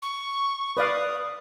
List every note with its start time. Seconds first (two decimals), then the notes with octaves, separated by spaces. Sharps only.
0.02 C#6
0.77 B4 D5 F5 D#6